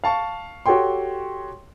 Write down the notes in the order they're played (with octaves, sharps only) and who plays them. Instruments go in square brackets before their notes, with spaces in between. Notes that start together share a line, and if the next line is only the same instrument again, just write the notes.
[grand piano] F5 A5 C#6
F#4 G4 A4 C#5 G5 C6